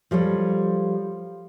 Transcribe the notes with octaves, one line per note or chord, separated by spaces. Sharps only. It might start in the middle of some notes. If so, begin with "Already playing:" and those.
F3 G3 A4 C#5